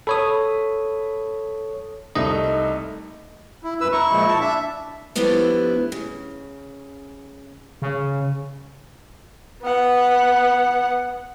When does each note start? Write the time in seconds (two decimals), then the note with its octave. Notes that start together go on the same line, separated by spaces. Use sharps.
0.07 A4 C#5 B5 D#6
2.15 C2 A3 D#4 D#5
3.64 E4
3.81 F#2 B4 E6
3.92 E4 A#5 C#6
4.11 A#2 F3 G#3
4.28 A5
4.41 D4 E5
5.15 F3 A3 B3 D4 E4 G4
5.92 C#3
7.82 C#3
9.62 B3 F#5